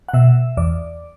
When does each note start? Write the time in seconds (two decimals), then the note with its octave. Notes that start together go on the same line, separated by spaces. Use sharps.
0.08 F#5
0.13 B2 E5
0.57 E2 D5